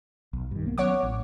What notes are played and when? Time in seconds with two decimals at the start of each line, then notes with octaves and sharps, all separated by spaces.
0.33 B1
0.51 G2 D#3
0.64 B1 A#3 B3
0.78 F#3 B3 C#4 C#5 F#5 D6
1.03 A1